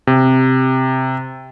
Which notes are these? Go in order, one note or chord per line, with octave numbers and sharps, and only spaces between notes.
C3